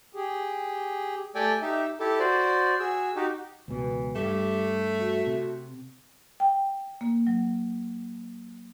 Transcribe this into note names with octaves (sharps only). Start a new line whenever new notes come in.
G4 G#4
A3 G4 A4 D5 G5 G#5
D#4 G4 E5
E4 G4 A4
F#4 C5 D5
F#4 G#4 E6
D#4 F#4 G4
C#2 B2 E3
G2 A3 G4
F#4
C3
G5
A#3
F#3